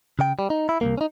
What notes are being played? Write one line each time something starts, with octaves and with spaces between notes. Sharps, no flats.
C#3 G5
G3
D#4
E4
C2 G2 A#3
C#4 D#4